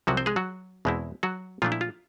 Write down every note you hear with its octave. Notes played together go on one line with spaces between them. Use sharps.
C2 C3 F3 F#3 F#4
C4 C5
G#3 G#4
F#3 F#4
E2 B2 G#3 C4 E4
F#3 F#4
A#2 F3 A3 D4 F4
E4
F4